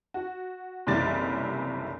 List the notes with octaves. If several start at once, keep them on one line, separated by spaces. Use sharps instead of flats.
F#4
F#1 B1 C3 E3 G3 A6